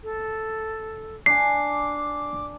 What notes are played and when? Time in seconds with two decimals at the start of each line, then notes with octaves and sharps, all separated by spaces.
0.03 A4
1.26 D4 G#5 D6 C7